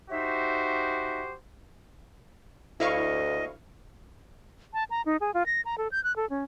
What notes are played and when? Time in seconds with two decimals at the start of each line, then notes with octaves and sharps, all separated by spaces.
0.10 D#4 F#4 G4 C5 E5
2.80 D2 E4 D#5 F5 C#6
4.74 A5
4.90 A#5
5.06 D#4
5.21 G#4
5.34 F4
5.46 A#6
5.65 A#5
5.78 A4
5.92 G6
6.04 F#6
6.16 A4
6.30 C#4